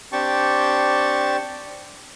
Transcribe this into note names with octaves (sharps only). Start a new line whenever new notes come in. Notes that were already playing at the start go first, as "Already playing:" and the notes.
C4 D4 G4 G5 A5 C#6